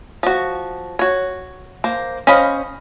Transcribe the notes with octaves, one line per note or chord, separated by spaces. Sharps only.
F3 F#4
F#4 C#5
A#3 C5
C#4 C5 D#5 F5 B5